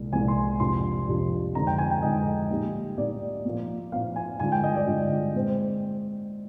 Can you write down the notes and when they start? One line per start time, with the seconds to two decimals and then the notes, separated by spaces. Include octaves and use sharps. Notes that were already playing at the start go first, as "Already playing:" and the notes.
Already playing: C2 A#2 G#3
0.13 C2 A#2 G#3 G#5
0.28 C6
0.60 F2 C3 G3 D4 F4 C6
1.08 F2 C3 G3 D4 F4
1.55 F2 D3 G#3 D#4 A#5
1.67 G5
1.78 G#5
1.91 G5
2.02 F2 D3 G#3 D#4 D#5
2.50 A#2 G3 A#3 D#4
2.98 A#2 G3 A#3 D#4 D5
3.45 A#2 F3 A#3
3.92 A#2 F3 A#3 F5
4.16 G#5
4.40 G2 D3 G#3 D4 F4 G#5
4.52 G5
4.64 D#5
4.76 D5
4.87 G2 D3 G#3 D4 F4
5.34 A#2 G#3 C4